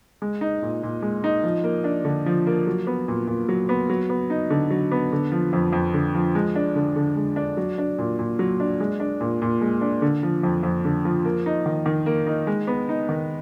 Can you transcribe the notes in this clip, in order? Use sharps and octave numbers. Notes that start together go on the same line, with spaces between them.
G#3
D#4
A#2
A#2
G#3
D#4
F3
A#3
D4
D3
F3
A#3
F#3
B3
A#2
A#2
F#3
B3
F#3
B3
D#4
D3
F#3
B3
D3
F3
F2
F2
D3
F3
G#3
D4
D3
D3
G#3
D4
F#3
D4
A#2
A#2
F#3
D4
G#3
D4
A#2
A#2
G#3
D4
D3
F3
F2
F2
D3
F3
A#3
D#4
D#3
D#3
A#3
D#4
G#3
B3
D#4
D#3